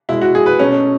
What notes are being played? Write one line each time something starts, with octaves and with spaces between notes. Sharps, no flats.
B2 G#3 E4
F#4
G#4
B4
B2 F#3 A3 C#4